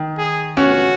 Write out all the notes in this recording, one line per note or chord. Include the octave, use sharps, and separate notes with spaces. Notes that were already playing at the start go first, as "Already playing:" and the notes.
Already playing: D#3
G#4
C#4 F#4